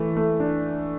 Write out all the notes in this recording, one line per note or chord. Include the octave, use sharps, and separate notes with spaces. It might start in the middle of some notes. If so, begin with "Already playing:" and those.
Already playing: E3 A3
A3
D4